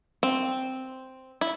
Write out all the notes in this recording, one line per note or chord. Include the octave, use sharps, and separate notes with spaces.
C4
E4